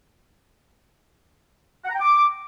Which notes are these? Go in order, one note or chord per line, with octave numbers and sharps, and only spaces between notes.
F#5
A#5
G5
D6